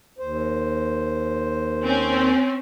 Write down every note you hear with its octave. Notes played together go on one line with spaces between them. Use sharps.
D#2 C5
C4 C#4